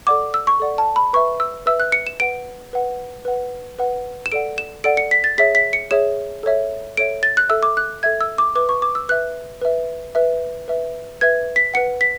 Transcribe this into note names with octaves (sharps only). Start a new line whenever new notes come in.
A4 D5 F#5 D6
E6
C#6
A4 D5 F#5
A5
B5
B4 E5 C#6
E6
B4 E5 E6
F#6
C#7
E7
B4 F#5 D7
B4 F#5
B4 F#5
B4 F#5
E7
A4 D5 F#5 D7
E7
A4 D5 F#5 D7
C#7
B6
A6
G#4 C#5 E5 B6
B6
C#7
G#4 C#5 E5 E7
A4 C#5 E5
A4 C#5 E5 D7
A6
F#6
A4 E5 E6
D6
F#6
A4 E5 G#6
E6
D6
B4 E5 D6
C#6
D6
E6
B4 E5 F#6
B4 E5
B4 E5
B4 E5
B4 E5 G#6
B6
B4 F#5 C#7
B6